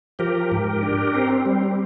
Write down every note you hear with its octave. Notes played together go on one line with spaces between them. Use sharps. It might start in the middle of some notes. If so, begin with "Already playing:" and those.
F3 G4 A#4
G#2
D4
C4
G3